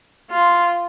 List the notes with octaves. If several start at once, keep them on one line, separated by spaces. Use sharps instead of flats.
F4